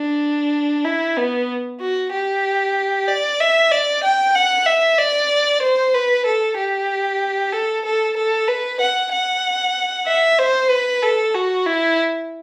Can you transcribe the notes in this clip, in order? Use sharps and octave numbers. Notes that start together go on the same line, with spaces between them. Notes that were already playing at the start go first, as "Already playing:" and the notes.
Already playing: D4
E4
B3
F#4
G4
D5
E5
D5
G5
F#5
E5
D5
C5
B4
A4
G4
A4
A4
A4
B4
F#5
F#5
E5
C5
B4
A4
F#4
E4